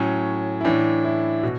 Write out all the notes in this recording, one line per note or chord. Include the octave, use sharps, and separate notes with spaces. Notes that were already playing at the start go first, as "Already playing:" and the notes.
Already playing: A2 F#3 C#4
E4
A2 E3 D4
E4
B2 F#4